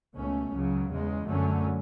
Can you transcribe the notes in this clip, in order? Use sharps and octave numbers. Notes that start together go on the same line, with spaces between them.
C#2 B2 A3 C#4
C#2 C#3 F#3
E2 C#3 G#3
F#2 D3 F#3 A3 C#4